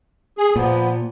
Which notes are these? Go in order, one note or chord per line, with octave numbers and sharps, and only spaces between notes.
G#4
A#2 F3 B3